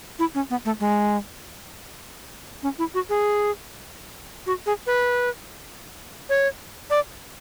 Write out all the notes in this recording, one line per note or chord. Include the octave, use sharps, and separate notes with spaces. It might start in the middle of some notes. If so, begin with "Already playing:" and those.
E4
C#4
B3
A3
G#3
C#4
E4
F#4
G#4
F#4
G#4
B4
C#5
D5